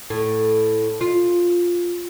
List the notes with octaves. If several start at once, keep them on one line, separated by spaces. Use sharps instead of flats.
A2
F4